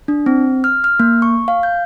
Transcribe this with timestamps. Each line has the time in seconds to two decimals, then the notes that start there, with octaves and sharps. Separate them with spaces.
0.08 D4
0.26 C4
0.64 F6
0.84 F6
1.00 A#3
1.22 C#6
1.48 F5
1.63 G6